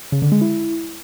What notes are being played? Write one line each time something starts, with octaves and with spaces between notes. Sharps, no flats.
C#3
D3
G#3
E4